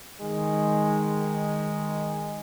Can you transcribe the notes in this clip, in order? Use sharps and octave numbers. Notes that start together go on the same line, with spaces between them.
D#3 G#3